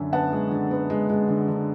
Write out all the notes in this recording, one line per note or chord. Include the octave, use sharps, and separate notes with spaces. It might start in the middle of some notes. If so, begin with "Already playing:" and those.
Already playing: F#2 D3 E5 G#5
B3 F#5 A5
G#3
D3
B3
G#3
G#3
D3
D3